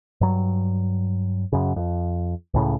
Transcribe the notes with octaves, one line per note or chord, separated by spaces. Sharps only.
G2 F#3
F#2 C#3
F2
C#2 A2 C#3